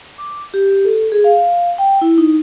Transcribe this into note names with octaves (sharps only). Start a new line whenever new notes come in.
D6
G4
A4
G#4
F5
G5
E4
D#4